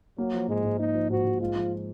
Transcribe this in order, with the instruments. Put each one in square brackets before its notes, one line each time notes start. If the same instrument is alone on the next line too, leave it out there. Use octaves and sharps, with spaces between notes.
[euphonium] F#3 [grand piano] A#3
[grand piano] F3
[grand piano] G#2 [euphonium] G#3
[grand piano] G#2
[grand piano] A#3 [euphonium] D#4
[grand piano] F3
[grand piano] G#2 [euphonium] F#4
[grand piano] G#2
[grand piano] G#3 [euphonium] F4
[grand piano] F3